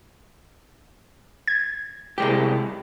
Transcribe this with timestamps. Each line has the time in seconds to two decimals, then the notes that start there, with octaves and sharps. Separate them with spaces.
1.48 G#6
2.18 C2 G#3 G4